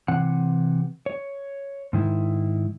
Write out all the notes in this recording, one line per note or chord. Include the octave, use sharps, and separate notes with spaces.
C3 E3 F#5
C#5
G#2 D#3 E4